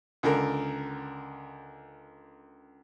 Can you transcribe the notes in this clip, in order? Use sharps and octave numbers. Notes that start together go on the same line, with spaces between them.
C#2 D3 A#4